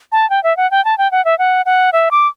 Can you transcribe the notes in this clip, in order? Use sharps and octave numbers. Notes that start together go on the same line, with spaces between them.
A5
G5
E5
F#5
G5
A5
G5
F#5
E5
F#5
F#5
E5
D6